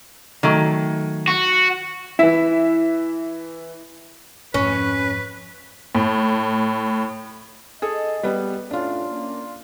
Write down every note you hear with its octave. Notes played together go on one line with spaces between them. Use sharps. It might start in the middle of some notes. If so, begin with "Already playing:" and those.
D#3 F#3 A3
F#4
E3 E4 E5
F2 G#2 C#4 B4
A2
G#4 A4 D#5
G3 B3 B4
A2 C#4 D4 F4
A#3 C#4